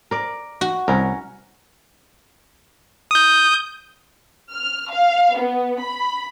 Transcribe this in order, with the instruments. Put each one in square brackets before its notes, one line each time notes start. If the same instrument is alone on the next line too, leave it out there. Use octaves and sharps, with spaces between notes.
[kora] A#4 D5
[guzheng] F#4
[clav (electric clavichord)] C2 [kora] C#4 A#4
[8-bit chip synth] D#6 G6
[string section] F6
F5
B3
B5